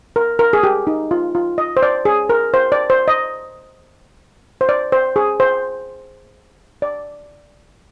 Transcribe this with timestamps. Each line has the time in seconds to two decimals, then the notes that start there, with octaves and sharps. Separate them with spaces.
0.16 A#4
0.39 A#4
0.53 G#4
0.63 G4
0.87 D#4
1.11 F4
1.35 F4
1.58 D#5
1.77 C5
1.82 D5
2.05 G#4
2.29 A#4
2.54 C5
2.72 D5
2.90 C5
3.08 D#5
4.61 C5
4.69 D5
4.92 C5
5.16 G#4
5.40 C5
6.82 D5